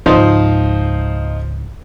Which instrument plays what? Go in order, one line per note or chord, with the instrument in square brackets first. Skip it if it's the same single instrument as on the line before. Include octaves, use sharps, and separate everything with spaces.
[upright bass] C#2 G#2 [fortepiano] F3 D#4 C5